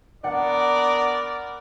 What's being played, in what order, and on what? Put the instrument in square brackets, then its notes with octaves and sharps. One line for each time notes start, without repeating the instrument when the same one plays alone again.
[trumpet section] B3 A#4 [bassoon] D4 [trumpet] D5 [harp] F#5